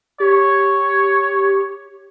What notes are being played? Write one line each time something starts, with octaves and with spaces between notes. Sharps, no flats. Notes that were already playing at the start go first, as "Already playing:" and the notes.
G4 C#5